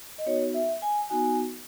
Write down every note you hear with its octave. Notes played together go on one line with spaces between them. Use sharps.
D#5
B3 D#4 F#4 C#5
E5
G#5
B3 D#4 F#4 G#5